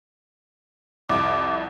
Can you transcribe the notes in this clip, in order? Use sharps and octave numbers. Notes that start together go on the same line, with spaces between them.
C2 F2 D6